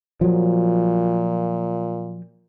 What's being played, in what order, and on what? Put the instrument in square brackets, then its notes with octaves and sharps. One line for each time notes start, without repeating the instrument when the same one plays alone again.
[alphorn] A#2 [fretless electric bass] F3 F#3